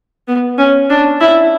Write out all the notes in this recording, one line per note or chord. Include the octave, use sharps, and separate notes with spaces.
B3
C#4
D4
E4